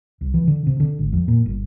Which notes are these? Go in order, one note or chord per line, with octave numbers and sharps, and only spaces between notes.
C2
E3
D3
C3
D3
G#1
F2
A#2
G1